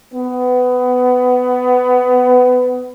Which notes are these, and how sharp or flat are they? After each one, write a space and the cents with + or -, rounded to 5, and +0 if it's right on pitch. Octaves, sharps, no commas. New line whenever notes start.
B3 +20